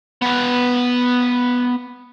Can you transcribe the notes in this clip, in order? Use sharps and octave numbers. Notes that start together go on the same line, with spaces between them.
B3 F5